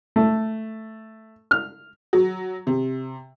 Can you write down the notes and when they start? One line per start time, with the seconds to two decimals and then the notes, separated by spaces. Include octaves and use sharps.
0.16 A3
1.51 F6
2.13 F#3
2.67 C3